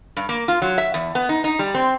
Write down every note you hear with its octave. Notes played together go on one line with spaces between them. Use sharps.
G2
A#3
F4
F#3
E5
E2
B3
D#4
D#4
G3
C4